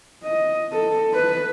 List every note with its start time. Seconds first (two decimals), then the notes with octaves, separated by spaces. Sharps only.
0.23 D#5
0.72 A4
1.13 B4